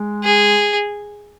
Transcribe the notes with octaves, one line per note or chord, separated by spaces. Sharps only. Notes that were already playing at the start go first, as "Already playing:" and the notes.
Already playing: G#3
G#4